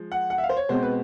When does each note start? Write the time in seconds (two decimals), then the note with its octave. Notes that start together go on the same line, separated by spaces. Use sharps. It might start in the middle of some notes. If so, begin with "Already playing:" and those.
Already playing: F3 G#3
0.12 F#5
0.30 F#5
0.38 E5
0.44 F5
0.49 C5
0.57 C#5
0.69 B2 G#3 C4 C5
0.83 B4